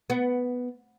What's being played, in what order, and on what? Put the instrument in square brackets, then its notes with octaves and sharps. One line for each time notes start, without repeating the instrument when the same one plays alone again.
[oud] B3